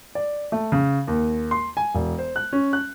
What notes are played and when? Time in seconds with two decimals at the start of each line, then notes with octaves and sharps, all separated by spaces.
0.15 D5
0.52 A3
0.72 C#3
1.07 D#2
1.51 C6
1.77 G#5
1.95 E1
2.18 C5
2.36 F#6
2.53 C#4
2.73 F#6